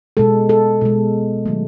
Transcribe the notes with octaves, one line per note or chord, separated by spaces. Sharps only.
B2 G#3 A4
A4
B2 G#3
D#3 F#3 A3